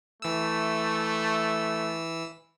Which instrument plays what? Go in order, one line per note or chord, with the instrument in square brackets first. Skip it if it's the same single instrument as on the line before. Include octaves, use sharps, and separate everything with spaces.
[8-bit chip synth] E3 E6 [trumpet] A3